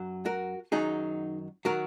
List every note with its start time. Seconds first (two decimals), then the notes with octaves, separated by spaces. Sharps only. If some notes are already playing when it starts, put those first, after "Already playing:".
Already playing: F#2 F#3
0.26 F#4 A#4
0.72 F#2 D#3 F#3 D#4 G#4
1.65 D#3 F#3 F#4 A#4